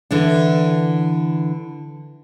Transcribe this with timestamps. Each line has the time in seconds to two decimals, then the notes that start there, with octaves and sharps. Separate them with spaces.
0.11 D3 E3 D4